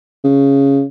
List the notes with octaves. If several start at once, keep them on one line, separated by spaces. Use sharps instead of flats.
C#3